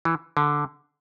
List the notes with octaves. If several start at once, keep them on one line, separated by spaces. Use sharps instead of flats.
E3
D3